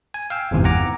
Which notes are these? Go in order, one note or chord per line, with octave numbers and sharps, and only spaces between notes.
G#5
F5 G5 E6
G1 E2 G#2 C3 E3
F#5 G#5 A#5 D6